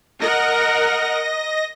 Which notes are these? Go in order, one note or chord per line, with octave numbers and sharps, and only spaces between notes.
A#4 D#5 F#5 A#6